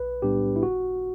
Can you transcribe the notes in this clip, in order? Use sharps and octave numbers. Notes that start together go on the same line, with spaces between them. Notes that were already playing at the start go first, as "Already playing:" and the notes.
Already playing: B1 B4
A2 G3 B3 D4 G4
E4
G1 F#4